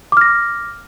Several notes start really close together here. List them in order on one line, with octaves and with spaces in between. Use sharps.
D6 F6 A#6